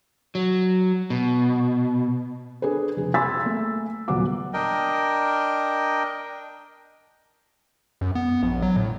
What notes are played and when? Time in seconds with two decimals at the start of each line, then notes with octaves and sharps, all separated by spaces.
0.35 F#3
1.10 B2
2.62 D4 G#4 A4 B4
2.97 F1 G#4
3.14 G#5 B5 C6 E6 A6 B6
3.46 A3 A#3
4.08 D#1 A#2 F#3 B3 F#5 D6
4.53 D4 A#4 D#5 G5
8.01 F#2
8.15 B3
8.43 A#1
8.62 F#3
8.76 A2